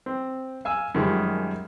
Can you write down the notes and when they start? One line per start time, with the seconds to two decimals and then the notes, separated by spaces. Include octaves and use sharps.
0.06 C4
0.65 F5 G#5 E6
0.94 F#2 D#3 F3 G3 G#3